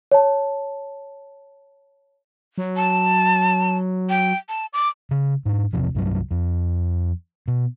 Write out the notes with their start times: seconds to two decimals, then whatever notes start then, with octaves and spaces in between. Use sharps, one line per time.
0.11 C#5 A5
2.58 F#3
2.76 A5
4.10 G5
4.49 A5
4.73 D6
5.11 C#3
5.46 G#2 D4
5.73 G#1 E2 C3 F3
5.95 C2 G2 D#3 F#3
6.31 F2
7.48 B2